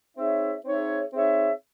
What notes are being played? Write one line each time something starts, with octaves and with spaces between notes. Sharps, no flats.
C4 D#4 G#4 C#5 E5
C4 D#4 G#4 C#5 E5
C4 D#4 G#4 C#5 E5